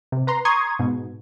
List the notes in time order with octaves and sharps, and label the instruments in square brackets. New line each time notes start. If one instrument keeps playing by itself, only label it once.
[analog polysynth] C3
B4 A#5 C6
A#5 C6 C#6 D#6 G#6
G#2 B2